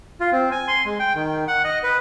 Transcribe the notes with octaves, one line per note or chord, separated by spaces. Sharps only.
F4
C4
G#5
C6
G#3
G5
D#3
F#5
D#5
B4